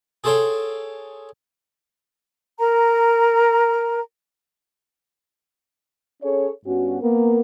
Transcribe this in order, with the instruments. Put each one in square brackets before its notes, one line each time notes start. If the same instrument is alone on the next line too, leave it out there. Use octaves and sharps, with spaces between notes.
[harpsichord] G#4 A4 C5 C#5 F5 G5
[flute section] A#4 A#5
[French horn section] C#4 G#4 A4 C#5
G2 B3 C#4 F#4
A#3 B3 A#4